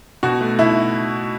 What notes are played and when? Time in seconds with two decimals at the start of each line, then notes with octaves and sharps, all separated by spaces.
0.23 B2 F#4
0.41 A3
0.59 B2 E4